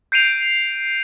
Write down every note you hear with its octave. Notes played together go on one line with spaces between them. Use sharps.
G6 C7 D7 D#7 F7